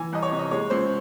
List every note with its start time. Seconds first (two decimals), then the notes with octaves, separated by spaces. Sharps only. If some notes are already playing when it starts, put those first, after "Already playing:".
Already playing: E3 G#5
0.13 C2 D#5
0.22 C#5
0.32 C3
0.39 D#5
0.51 G#3 C#5
0.70 C#2 C5